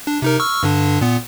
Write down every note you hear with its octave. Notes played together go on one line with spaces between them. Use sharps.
D4
C3 D#4 A#4
C#6 E6 F6
G2 D3 D4
A#2 B3